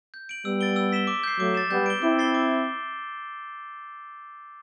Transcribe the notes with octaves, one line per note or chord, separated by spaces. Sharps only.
G6
D7 F#7
G3 B3 E6
A6 D7 G7
E6
B6 E7 G7
D6
G6 C7
F#3 A3 D6
A6 E7
G3 B3 G6
D7 G7
C4 E4 D6
A6 C7 G7
D6